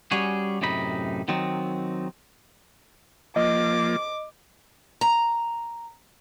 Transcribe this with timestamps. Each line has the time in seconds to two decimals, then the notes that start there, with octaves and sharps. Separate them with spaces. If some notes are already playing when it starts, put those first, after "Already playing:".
0.12 G3 C#4 F#4 G#4
0.62 F#2 A2 C3 D#4 B5
1.28 D#3 F#3 C4 D#4
3.36 F3 A#3 D#5 D6
5.01 A#5